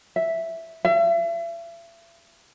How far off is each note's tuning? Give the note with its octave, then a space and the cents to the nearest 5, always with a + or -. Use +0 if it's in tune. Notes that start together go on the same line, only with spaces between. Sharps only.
E5 +0
E5 +40